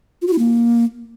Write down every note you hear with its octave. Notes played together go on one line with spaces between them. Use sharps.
F4
F#4
E4
A#3